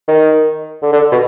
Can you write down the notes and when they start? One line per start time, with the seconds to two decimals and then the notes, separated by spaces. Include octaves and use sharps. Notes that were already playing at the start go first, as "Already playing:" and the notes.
0.08 D#3
0.83 D3
0.93 D3
1.12 B2